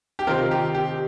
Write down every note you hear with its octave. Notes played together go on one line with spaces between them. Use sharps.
G4
C3 D#3 C4 F4 A#4
G4
G4